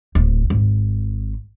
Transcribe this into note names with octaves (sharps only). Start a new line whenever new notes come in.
D1
G#1